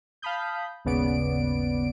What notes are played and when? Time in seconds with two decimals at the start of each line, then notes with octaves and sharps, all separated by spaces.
0.22 F5 A5 B5 D#6 G6
0.85 G#1 D#2 C#3 B3 D5 D7